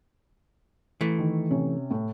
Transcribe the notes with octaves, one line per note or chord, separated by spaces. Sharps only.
E3 A3
D#3
C3 C#4
A2